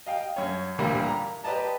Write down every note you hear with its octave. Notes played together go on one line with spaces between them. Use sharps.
D#5 F5 G5
F#2 C#5
A1 D2 A#2 G3 A#3
A#5
G4 B4 D5 D#5 A5 A#5